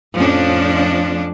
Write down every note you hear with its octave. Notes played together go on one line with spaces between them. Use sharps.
F2 A2 F3 C#4 D4